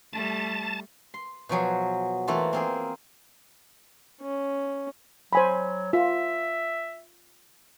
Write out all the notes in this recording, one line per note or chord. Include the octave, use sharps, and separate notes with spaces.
G3 A3 A5
C6
B2 F3 F#3 G#4
E3 A3 A#3 F4
A#3 C4 G#4
C#4
F#3 C5 G#5 B5
F4 E5